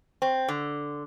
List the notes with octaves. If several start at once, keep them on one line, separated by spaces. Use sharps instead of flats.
C4
D3